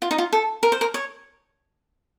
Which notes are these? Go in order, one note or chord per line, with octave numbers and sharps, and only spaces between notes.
F4
D#4
F4
A4
A#4
C5
A#4
C#5